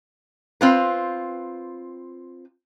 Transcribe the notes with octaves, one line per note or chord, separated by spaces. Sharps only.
C4 F4 B4